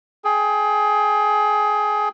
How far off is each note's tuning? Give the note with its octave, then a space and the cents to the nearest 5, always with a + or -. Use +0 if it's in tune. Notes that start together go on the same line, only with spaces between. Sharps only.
G#4 +25 G5 +30